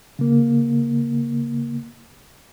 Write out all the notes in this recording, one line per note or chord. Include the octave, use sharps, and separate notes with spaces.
C#3 A#3